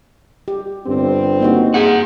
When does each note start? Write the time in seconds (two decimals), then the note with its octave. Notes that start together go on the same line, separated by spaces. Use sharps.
0.48 G4
0.86 G1 G2 C4
1.40 A#3 D#4 F#4
1.74 G#4 F#5